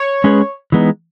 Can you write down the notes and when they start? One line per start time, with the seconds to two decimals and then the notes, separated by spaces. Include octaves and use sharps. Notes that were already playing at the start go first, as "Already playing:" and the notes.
Already playing: C#5
0.24 G#3 C#4 G#4 B4
0.72 E3 G#3 B3 D#4